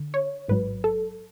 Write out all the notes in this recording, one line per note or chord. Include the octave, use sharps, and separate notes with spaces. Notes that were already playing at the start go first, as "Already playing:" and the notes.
Already playing: D3
C#5
A1 G#2 F#3 B4
A4